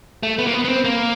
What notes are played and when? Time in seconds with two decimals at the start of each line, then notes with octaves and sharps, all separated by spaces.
0.23 A3
0.39 B3
0.47 A#3
0.53 B3
0.65 B3
0.69 C4
0.84 A#3